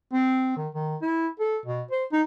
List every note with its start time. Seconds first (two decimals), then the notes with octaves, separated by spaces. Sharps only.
0.13 C4
0.57 D#3
0.74 D#3
1.02 E4
1.40 A4
1.65 B2
1.91 C5
2.12 D#4